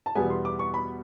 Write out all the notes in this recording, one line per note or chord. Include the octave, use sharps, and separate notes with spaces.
A5
E2 B2 G3 B3 G#5
C6
D6
C#6
B5